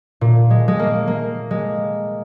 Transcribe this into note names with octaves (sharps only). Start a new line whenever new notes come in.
A#2
G#3
G#3
A#3
A#3
G#3